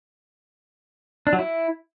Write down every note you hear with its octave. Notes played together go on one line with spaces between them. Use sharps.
D4
F#3
E4